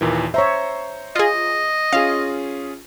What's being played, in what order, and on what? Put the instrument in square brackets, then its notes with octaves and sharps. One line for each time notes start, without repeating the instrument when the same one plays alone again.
[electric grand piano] D#2 A#2 E3
[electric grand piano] C5 A#5 C#6 [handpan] C#5 E5
[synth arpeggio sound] F4 G#4 [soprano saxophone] D#5
[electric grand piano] C#4 F4 G#4 [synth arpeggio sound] F5